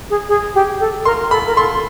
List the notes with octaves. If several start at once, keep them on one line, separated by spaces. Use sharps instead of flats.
G#4
G#4
G4
A4
A#4 C6
A4 B5
A#4
A4 C6